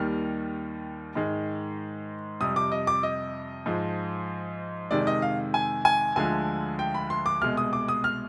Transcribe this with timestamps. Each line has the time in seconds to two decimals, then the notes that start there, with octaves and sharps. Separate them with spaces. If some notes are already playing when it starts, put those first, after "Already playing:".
Already playing: D#2 D#3 G3 F6
1.15 G#2 D#3 G#3
2.40 F2 C3 G3 D#6
2.56 D6
2.72 D#5
2.87 D6
3.03 D#5
3.66 G#2 F3 G#3
4.90 F2 C3 D#3 G#3 D5
5.07 D#5
5.22 F5
5.54 G#5
5.85 G#5
6.16 D2 D3 F3 G#3 G#5
6.79 G5
6.95 B5
7.10 C6
7.26 D6
7.41 C2 B2 G#3 F6
7.57 D#6
7.73 D6
7.88 D#6
8.04 F6